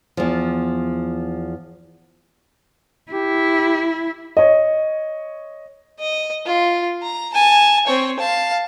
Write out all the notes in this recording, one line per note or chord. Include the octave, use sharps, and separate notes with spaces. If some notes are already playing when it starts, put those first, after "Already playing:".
E2 F3
E4 G4
C#5 D#5
D#5
F4
A#5
G#5 A5
C4 C#5
F5 A5